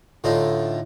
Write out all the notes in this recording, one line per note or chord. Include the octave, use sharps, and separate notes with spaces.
A2 D3 D#4 F4